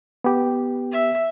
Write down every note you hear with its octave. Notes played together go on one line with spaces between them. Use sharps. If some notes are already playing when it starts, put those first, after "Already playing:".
B3 G4
E5